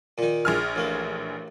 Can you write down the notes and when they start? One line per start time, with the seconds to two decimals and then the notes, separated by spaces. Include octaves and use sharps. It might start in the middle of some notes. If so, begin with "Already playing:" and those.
0.18 A#2 D#3
0.45 A#1 G#4 F6
0.76 A1 A#3